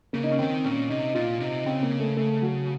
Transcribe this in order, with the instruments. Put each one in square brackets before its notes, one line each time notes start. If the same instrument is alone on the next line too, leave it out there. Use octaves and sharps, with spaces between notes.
[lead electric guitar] C#3 [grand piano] A#3
[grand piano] D#4
C#4
[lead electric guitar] D#3 [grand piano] C4
[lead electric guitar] A#2 [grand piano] C#4
[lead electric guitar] C3 [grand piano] D#4
[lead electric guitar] A#2 [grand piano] F4
[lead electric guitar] C3 [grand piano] D#4
[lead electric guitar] C#3 [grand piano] C4
[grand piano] A#3
A3
A3
F#3